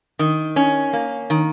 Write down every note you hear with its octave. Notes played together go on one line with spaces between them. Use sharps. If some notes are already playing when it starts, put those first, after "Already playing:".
D#3
C#4
A#3
D#3